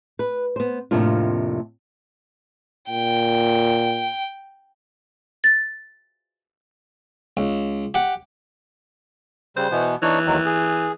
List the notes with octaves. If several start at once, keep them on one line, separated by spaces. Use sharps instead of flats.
B4
B3 C5
F2 A2 C3 A#3 D4 F4
A#2 G5
A6
C#2
G4 F#5
C#3 G3 C5
B2 E3 B3
E3 D4 D#4 C#5
D#2 D#3 F#3
G#4